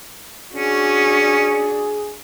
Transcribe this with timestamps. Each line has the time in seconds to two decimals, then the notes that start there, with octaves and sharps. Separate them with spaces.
0.54 C#4 D4 F#4 G#4